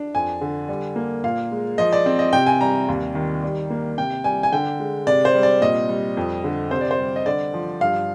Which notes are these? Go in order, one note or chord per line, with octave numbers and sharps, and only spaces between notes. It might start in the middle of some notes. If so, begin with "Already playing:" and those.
Already playing: D4
F2 G#5
D3
G3
A#3
A#2 F5
G#3
F3 D#5
D5
C4
D#5
C3 G5
G#5
G3 A#5
D#2
D#3
G3
A#3
C3 G5
G3 G#5
G#5
D3 G5
G#3
C3 D5
C5
G3
D5
A#2 D#5
G3
F2
D3
C3 C5
D5
C5
G3
D#5
D3 D5
F3
G2 F5